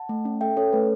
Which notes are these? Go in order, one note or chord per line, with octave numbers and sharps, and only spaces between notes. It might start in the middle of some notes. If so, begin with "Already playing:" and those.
Already playing: F#5 A5
A3
C#4
A4 E5 G5
C#4 A4 C#5
A3 B4